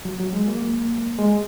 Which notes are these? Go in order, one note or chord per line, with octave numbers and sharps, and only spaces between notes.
F#3
F#3
G#3
A#3
G#3